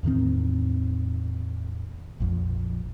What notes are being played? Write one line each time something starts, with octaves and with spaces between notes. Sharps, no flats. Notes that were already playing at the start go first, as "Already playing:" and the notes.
E2 A2 D#3 C4
A#1 F2